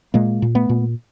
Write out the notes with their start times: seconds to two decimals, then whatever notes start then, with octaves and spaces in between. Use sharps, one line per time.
0.14 A#2 G#3 A#3
0.42 A#2
0.55 A3 B3
0.69 A#2